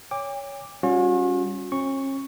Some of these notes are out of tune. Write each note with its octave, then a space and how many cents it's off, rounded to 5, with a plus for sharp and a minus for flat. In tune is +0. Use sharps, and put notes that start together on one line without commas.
C#5 +15 G5 +45 D6 +0
G3 +0 C#4 +0 F#4 -45
C#4 -40 C#6 +0